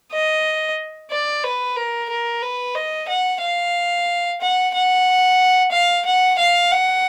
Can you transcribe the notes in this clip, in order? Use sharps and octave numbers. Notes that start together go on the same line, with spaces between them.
D#5
D5
B4
A#4
A#4
B4
D#5
F#5
F5
F#5
F#5
F5
F#5
F5
F#5